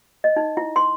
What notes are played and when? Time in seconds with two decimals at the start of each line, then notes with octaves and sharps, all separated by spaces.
0.24 D#5
0.36 D#4
0.57 E4
0.76 C6